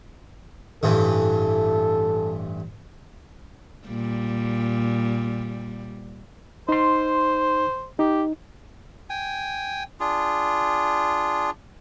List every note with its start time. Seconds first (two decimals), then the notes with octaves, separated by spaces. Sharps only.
0.83 A1 G2 E3 A4
3.87 A#2 G3
6.69 D#4 C5 C6
7.99 D#4 G4
9.10 G5 G#5
10.00 D4 F4 G#4